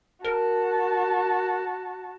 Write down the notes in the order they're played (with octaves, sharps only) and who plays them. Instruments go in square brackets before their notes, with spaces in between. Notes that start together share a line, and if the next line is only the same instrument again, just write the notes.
[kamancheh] F#4 A5 [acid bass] A#4